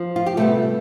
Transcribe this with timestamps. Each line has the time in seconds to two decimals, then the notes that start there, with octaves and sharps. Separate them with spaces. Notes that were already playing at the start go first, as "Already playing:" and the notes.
Already playing: F3
0.16 F4
0.26 G4
0.37 C3 G3 A3 B3 A4